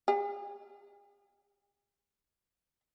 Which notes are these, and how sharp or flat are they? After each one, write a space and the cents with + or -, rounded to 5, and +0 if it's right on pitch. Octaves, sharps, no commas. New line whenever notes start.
G#4 -45